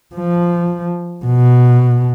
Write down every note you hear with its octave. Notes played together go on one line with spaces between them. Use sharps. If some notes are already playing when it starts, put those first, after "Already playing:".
F3
B2